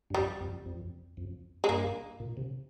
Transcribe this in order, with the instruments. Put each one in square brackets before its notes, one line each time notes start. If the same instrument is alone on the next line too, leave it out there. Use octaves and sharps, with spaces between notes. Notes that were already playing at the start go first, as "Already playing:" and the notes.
[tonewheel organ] G2
[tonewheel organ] F2 [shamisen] G3
[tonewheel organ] F2
F2
F2
[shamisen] G#3
[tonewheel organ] G2 [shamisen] A#3
[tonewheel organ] A#2
C3